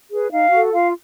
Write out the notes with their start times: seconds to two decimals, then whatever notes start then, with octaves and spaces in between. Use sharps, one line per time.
0.11 G#4 B4
0.31 D#4 F5
0.52 F#4 A4
0.72 F4 F5